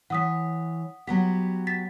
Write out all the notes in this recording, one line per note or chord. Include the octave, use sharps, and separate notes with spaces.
E3 C#5 F#5 D#6 B6
F#3 B3 G4 F#5 B6
A6 B6